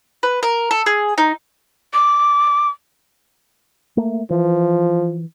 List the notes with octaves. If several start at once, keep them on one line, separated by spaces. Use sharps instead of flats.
B4
A#4
A4
G#4
D#4
D6
A3 A#3
E3 F3